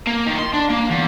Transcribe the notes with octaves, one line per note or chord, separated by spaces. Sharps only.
A#3
D#3
C6
D4
A#3
E2